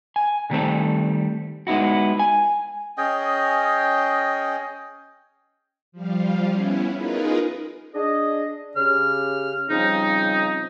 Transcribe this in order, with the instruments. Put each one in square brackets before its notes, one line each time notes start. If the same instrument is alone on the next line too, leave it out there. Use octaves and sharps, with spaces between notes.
[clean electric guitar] G#5
D3 D#3 G3 A3 C4 A4
G#3 B3 D#4 E4 F#4
G#5
[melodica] C#4 G#4 D#5 G5
[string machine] F3 G3 F4
B3 C#4 E4
D#4 F4 G#4 A#4 B4
[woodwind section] D4 G#4 D#5
C#3 G4 F6
C#3 F3 G3 C4 D#4